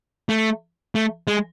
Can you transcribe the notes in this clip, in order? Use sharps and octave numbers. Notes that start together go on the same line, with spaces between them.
A3
A3
G#3